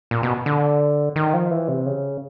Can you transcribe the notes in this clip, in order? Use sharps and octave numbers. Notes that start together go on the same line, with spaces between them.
A#2
B2
D3
D#3
F3
E3
C3
C#3